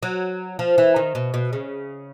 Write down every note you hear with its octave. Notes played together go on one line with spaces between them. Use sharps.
F#3
F3
E3
D#3
B2
B2
C#3